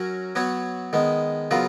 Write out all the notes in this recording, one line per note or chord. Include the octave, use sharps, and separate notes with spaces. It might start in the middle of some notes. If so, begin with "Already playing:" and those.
Already playing: F#3 C#4 F#4 A#4
F#3 B3 F#4 C#5
D#3 G#3 B3
C#3 F#3 B3 F4 A#4